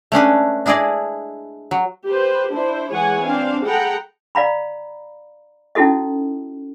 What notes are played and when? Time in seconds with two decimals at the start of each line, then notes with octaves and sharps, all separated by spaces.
0.12 A3 C#4 D4 B4
0.66 D4 E4 G#4 D5 D#5
1.71 F#3
2.06 G4 B4 C5
2.53 D4 E4 C5
2.91 E3 G#3 G#4 C#5 F#5 G#5
3.21 C4 D4 F5
3.66 G#4 A4 F#5 G5 A#5 B5
4.35 D5 F5 A#5 B5
5.75 C#4 D#4 E4 F#4 A4 D#5